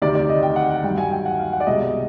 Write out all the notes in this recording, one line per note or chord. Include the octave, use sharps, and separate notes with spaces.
D2 C3 D#3 D5
D5
D#5
G5
F#5
F#5
G2 D#3 F#3 G5
G#5
G5
F#5
F5
F#5
D5
C2 B2 G#3 D#5